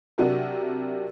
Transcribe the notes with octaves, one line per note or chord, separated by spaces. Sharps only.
C3 F#3 D4 F#4 G4 A#4